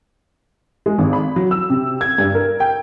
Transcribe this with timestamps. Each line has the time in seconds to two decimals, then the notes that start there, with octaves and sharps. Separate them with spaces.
0.86 G#3
0.98 G#1
1.13 B5
1.36 F#3
1.51 E6
1.70 C3
2.01 G#6
2.18 G2
2.34 A#4
2.60 G5